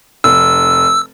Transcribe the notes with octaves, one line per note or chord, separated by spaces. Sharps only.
F1 E6